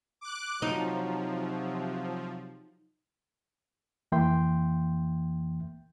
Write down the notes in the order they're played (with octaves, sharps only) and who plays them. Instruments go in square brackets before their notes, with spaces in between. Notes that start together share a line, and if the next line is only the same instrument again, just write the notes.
[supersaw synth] D6 F#6
[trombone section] C3 F#3 [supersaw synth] F3 [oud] D#4
[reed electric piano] F2 E3 A#3 E5 G5 C6